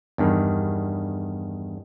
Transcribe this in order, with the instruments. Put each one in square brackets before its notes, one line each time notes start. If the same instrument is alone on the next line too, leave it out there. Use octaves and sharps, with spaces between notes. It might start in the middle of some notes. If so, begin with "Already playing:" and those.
[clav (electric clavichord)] E2 G2 D#3